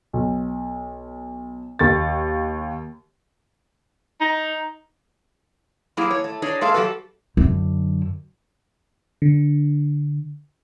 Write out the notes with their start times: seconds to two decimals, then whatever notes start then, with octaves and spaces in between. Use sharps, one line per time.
0.13 B1
1.79 D#2 A6
4.20 D#4
5.97 F#3 A3 A#3 E4 G4 G#4
6.11 C#5
6.24 A3
6.42 D4 D#4 G#4 C#5
6.61 G#3 A#3 G#4 A4 E5 F5
6.74 F#3 F#4 G4 A4 B4
7.37 F#2 D3
9.22 D3